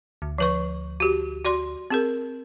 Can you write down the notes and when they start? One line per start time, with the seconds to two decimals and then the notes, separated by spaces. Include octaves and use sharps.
0.22 D2
0.38 F3 B4 C#6
1.00 F#4 G4
1.44 F#4 D5 C6
1.90 C4 G#4 A#4